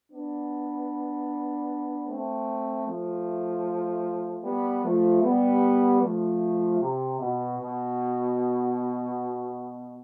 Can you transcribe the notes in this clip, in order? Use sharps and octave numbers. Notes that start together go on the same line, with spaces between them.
B3 D4
A3 C4
F3 A3
G3 B3
F3 A3
G3 B3
F3 A3
C3
B2
B2